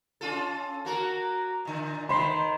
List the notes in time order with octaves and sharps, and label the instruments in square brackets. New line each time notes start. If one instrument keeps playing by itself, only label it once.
[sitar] C#4 F4 A4
A#3 F#4 A#4
A#2 D3
[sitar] D#3 C5 [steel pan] B5 C6